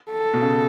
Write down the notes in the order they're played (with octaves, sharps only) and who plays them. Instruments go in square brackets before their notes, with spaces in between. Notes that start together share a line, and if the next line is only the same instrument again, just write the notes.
[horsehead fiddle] A4
[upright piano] B2
C#3